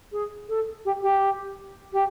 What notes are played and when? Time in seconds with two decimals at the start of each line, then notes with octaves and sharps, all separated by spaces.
0.12 G#4
0.49 A4
0.85 G4
1.03 G4
1.93 G4